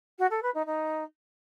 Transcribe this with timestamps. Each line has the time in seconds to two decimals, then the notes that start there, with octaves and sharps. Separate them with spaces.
0.18 F#4
0.30 A4
0.42 B4
0.54 D#4
0.66 D#4